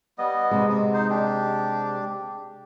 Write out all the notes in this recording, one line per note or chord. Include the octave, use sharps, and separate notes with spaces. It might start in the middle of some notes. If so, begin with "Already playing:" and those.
G3 B3 D#5
C3 G#3
D#4 C5
D4 G4